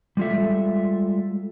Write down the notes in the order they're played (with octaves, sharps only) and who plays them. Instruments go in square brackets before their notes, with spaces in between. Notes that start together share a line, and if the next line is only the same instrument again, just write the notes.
[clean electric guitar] G3 G#3 F4 A4 E5